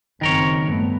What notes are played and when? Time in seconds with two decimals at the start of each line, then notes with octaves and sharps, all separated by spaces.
0.21 F#1 F#2 D#3 C4 A#4 C#5
0.63 G2 A3 B3